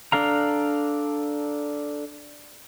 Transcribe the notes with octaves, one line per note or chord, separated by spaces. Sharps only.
D4 A4 F5 A#5